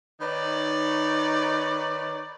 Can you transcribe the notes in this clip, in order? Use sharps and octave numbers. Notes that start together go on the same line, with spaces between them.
D#3 D#4 B4 C#5 D5